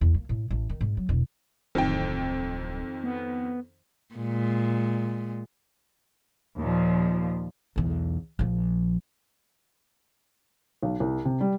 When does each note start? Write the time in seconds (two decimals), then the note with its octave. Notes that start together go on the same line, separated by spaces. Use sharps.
0.01 E2
0.14 A#3
0.29 A2
0.51 A1
0.70 D#3
0.81 G#2
0.97 F#3
1.09 E1
1.75 D1 F2 D#3 G5
3.04 B3
4.15 A#2 G#3
6.58 D#2 A#2 F3
7.76 B1 E2
8.39 A#1 F3
10.83 B1
11.00 C2
11.25 C3
11.41 G3